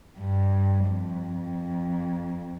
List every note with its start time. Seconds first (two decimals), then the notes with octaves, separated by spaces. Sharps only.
0.18 G2
0.88 F2